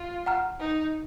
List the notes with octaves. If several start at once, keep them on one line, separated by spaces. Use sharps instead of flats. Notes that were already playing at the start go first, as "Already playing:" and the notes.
Already playing: F4
F#5 A#5 F6
D#4